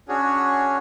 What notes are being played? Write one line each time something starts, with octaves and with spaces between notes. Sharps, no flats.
C#4 D4 F#4 G#4 C#5